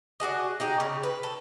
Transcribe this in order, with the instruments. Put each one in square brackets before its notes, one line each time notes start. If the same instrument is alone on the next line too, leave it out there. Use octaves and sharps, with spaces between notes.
[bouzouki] D4 F#4 G#4 D#5
D#4 G4 G#4
C#3
B4
A4